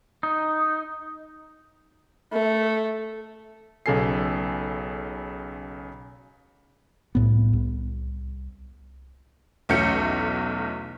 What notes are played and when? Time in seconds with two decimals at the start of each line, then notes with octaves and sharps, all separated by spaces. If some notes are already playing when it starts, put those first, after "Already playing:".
0.23 D#4
2.33 A3
3.86 B1 C#3 A4 G#5 C7
7.15 C2 A2 B3
7.53 C2
9.69 B1 E2 A3 C#4 G6 C#7